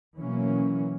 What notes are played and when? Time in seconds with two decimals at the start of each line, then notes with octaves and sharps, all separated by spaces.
0.19 B2 E3 F#3 A#3 C#4